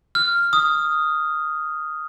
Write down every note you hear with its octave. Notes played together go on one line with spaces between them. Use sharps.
F6
D#6